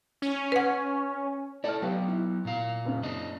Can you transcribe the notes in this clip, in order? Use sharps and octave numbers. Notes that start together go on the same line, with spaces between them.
C#4
B4 F#5
E4 A4 D5 A5 F6
F#3 B3 G4 B4 F5
E4
A#2 F5
F#1 C#3
D4 D#5